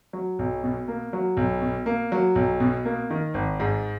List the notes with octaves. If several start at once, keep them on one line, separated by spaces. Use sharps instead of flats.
F#3
B1
B2
A#3
F#3
B1
B2
A#3
F#3
B1
B2
A#3
D#3
G#1
G#2